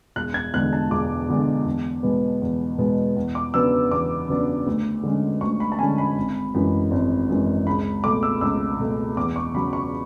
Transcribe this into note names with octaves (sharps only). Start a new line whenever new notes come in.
E1 F#6
G#6
E2 D3 G#3 F#6
A5
E1 D6
E2 D3 G#3
E2
B2 G#3 B3
E2
B2 G#3 B3
E2
D6
C#3 F#3 B3 D4 E6
E2 D6
C#3 F#3 B3 D4
D2
D3 G#3 C#4
D2 C#6
B5
A5
D3 G#3 C#4 G#5
B5
G#1
F#2 E3 G#3
G#1
F#2 E3 G#3
C#2 B5
B2 A3 D6
E6
C#2 E6
B2 A3
E2 D6
C#6
C#3 F#3 B5
C#6